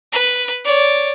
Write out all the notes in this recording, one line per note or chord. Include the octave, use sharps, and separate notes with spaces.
B4
C#5 D5